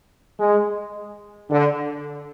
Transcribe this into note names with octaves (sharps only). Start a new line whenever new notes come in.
G#3
D3